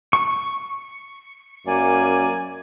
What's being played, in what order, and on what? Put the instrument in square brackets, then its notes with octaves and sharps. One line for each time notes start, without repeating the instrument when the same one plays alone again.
[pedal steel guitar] C#6
[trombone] F#2 [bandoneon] A#3 D5 [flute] G#5